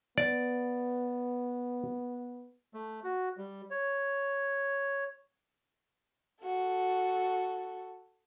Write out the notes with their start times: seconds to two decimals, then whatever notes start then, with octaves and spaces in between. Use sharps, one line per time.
0.18 B3 D5
2.74 A3
3.04 F#4
3.37 G3
3.71 C#5
6.44 F#4 A4